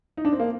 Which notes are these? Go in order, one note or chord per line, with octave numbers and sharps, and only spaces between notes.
D#4
D4
C4
A#3